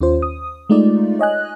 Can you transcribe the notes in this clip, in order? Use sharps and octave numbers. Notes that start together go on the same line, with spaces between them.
D#2 C#4 F4 C5
D#6
G#3 A3 D#4 F4 D5
C#5 D#5 G#5 F#6